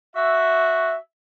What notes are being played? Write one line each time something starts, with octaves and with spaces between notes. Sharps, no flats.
F#4 E5